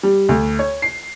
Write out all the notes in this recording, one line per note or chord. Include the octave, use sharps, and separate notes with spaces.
G3
D2
C#5
C7